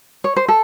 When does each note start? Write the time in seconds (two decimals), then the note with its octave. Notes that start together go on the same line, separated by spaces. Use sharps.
0.24 C#5
0.36 C5
0.48 A4